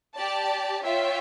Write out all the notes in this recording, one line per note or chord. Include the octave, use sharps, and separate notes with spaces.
G4 D5 A5
F4 C#5 E5 G5